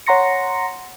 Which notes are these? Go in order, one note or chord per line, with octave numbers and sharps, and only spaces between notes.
C#5 F#5 A#5 C6 A#6 C#7